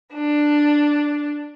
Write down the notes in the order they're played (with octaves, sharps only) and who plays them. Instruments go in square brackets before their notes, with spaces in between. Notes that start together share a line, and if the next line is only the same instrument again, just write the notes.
[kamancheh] D4